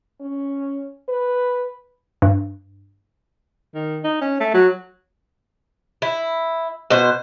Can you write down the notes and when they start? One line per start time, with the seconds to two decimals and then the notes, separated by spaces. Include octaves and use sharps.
0.21 C#4
1.09 B4
2.22 G2
3.75 D#3
4.04 D#4
4.21 C#4
4.40 A3
4.54 F#3
6.02 E4
6.90 B2 C5